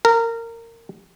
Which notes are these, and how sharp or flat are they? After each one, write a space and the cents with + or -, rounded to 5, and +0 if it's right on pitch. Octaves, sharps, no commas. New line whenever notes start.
A#4 -20